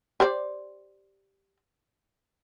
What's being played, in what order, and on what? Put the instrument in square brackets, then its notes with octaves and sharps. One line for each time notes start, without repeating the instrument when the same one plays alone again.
[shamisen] G4 C5 D5